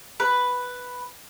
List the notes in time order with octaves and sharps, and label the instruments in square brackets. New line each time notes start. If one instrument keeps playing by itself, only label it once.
[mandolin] B4